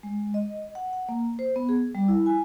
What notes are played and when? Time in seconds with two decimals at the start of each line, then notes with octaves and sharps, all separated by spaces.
0.03 G#3
0.34 D#5
0.75 F#5
0.93 F#5
1.09 A#3
1.39 C5
1.56 B3
1.69 G#4
1.95 G3
2.08 E4
2.26 G#5